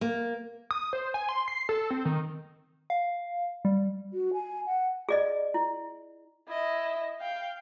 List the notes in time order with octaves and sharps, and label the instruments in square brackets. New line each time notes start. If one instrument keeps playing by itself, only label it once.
[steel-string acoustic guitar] A#3
[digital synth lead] D#6
C5
G#5
C6
C7
A4
C4
D#3
[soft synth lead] F5
G3
[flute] F#4
G#5
F#5
[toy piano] G#4 D5 D#5
E4
[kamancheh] E4 D#5
F5 G5